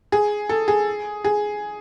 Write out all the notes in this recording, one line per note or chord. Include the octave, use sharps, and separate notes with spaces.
G#4
A4
G#4
G#4